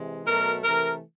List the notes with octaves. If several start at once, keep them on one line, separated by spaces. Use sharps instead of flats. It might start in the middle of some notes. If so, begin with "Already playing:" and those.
Already playing: C3 E3 G#3
B2 F#3 A3 A#4
C3 E3 A3 A#4